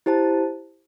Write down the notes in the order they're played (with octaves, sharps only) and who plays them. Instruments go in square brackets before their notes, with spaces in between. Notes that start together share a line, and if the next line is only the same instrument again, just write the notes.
[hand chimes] E4 G4 C5 A5